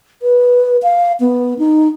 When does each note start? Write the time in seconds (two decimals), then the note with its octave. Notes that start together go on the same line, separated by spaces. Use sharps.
0.22 B4
0.83 F5
1.20 B3
1.59 D#4